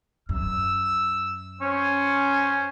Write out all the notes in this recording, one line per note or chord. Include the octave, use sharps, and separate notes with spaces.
F#2 E6
C#4 C5